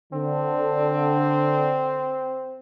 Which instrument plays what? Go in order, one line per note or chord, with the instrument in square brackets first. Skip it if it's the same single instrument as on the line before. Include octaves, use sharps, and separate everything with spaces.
[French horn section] D3 [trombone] C4